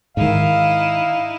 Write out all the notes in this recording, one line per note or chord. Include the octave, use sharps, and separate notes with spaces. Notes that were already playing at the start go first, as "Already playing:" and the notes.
G#2 D#3 D#4 E4 F5